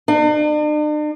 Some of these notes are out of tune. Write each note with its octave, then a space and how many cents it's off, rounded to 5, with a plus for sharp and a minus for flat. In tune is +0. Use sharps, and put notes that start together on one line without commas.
D4 +45